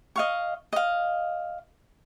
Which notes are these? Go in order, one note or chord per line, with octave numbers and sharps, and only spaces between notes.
D#5 F5 C#6
D#5 F5